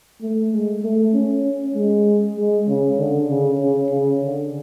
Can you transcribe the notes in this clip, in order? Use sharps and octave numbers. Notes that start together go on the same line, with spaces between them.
A3
G#3
A3
C#4
C#4
G#3
G#3
C#3
D3
C#3
C#3
C#3
D3